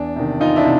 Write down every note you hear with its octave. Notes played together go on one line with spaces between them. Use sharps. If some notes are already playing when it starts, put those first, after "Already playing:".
Already playing: E2 D4
C3 D#3
E2 D#4 F4
D4 E4
C3